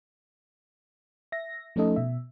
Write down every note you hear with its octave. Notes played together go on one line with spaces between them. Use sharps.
E5 A#6
F3 A3 C#4 D#4 A4 D#5
B2 E5